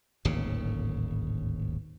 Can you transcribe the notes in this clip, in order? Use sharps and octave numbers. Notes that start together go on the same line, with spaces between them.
D1 G#1 D#2 C#3